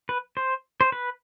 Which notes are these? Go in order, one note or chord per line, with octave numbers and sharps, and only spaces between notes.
B4
C5
C5
B4